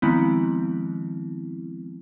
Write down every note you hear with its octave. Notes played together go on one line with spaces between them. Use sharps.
D#3 F3 G#3 B3 C4 E4